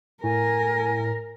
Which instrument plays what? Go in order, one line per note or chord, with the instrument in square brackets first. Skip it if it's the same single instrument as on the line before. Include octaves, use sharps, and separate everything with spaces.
[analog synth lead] A2 [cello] A#4 [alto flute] G#5